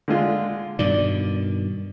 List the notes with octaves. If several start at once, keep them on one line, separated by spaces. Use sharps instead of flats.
D3 G#3 F4
G2 B2 D#3 D5